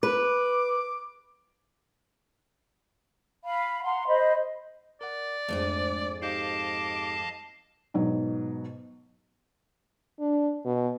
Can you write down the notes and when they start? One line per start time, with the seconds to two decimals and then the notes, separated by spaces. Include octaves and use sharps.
0.03 B4 D6
3.44 F5 B5
3.84 F5 F#5 A#5 C6
4.07 C5 D#5 B5
5.01 A#4 D5 F#5
5.48 F2 G#2 G#3 A3 D4 G#4
6.22 D#4 G4 D#5 F5 A5 D6 G6
7.94 G#2 B2 F#3
10.20 D4
10.65 B2